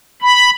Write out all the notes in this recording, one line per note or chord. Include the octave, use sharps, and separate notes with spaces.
B5